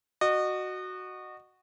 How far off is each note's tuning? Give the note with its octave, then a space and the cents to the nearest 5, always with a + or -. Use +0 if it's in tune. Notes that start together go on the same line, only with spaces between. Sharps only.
F#4 +0 D#5 -30